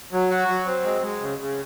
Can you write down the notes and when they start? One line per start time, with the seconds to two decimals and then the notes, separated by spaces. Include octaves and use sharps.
0.12 F#3
0.31 F#4
0.48 F#3
0.66 C4
0.84 G#3
1.02 G#3
1.20 C#3
1.39 C#3